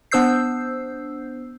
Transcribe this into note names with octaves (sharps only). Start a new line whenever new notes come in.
B3 D4 C5 E6 G6 C7